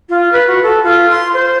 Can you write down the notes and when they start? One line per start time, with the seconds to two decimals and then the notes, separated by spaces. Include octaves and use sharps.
0.09 F4
0.32 B4
0.47 F#4
0.62 A4
0.83 F4
1.10 C6
1.33 C5